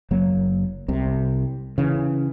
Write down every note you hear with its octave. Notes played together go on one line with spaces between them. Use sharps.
F#1 F#3 A#3
C2 C3
C#3 E3